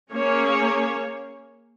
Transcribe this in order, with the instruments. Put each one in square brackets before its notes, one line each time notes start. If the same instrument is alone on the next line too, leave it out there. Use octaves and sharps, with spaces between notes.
[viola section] A#3 C#4 G#4 C#5